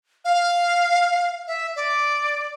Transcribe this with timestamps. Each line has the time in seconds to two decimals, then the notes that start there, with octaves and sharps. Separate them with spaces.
0.25 F5
1.47 E5
1.76 D5